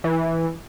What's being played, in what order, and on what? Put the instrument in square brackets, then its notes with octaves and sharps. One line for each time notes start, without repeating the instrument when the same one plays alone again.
[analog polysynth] E3